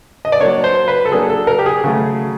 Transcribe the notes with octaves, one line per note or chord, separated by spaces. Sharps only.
D#5
D5
F#3 A#3 D4 C#5
C5
B4
A4
F#3 A#3 D4 G#4
A4
A#4
G4
G#4
C#3 F#3 A3